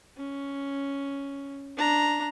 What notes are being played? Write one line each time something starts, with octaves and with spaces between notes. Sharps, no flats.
C#4
D4 A#5